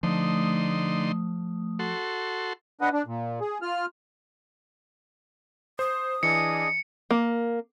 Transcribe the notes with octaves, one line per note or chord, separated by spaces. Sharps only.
D3 F3 A3 D#4 C6 D#6
F#4 A4 C6
D4 B4 D#5 F#5
D4
A#2
G#4
F4 F6
C5 D#6
E3 D4 G#4 D#5 C#7
A#3